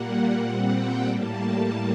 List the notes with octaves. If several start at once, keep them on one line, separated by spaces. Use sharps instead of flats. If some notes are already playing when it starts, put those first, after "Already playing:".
Already playing: A#2 G3 A#3 F#5
A#2 G3 C4
G5
A2 G3 A#3 A5